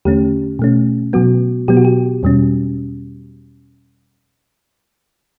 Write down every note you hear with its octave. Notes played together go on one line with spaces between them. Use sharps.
E2 D3 A3 C#4 G4
B2 A3 C#4
B2 F#3 B3 F#4
B2 F#3 B3 G4
F#4
G4
E2 B2 G3 C#4